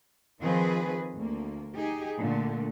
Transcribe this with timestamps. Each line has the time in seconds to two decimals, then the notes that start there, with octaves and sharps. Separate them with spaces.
0.40 D#3 F3 C4 G#4 B4
1.15 D2 A#3
1.75 D#4 G4 G#4
2.18 A#2 D3 A3